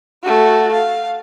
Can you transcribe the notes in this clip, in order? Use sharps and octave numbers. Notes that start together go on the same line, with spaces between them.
A3 F#4
F5